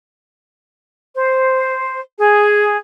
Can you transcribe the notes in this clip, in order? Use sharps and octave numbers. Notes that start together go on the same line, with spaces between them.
C5
G#4